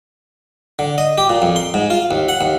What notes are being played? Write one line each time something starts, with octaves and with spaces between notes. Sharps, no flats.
D3
D#5
G4
A#2
F2
C6
G#2
F4
D#2
F#5
D#2